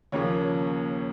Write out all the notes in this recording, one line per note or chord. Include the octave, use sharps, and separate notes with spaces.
D#2 C#3 F3 A#3 C#4 C#5